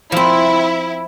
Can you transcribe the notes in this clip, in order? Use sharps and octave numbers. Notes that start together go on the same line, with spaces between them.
F3 C4 E4